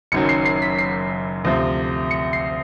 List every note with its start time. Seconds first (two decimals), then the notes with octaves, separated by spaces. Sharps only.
0.12 F#1 F#2 D#3 F#3 C#7
0.29 C7
0.46 C7
0.62 B6
0.79 C7
1.45 D2 C3 F3
2.11 C#7
2.33 C7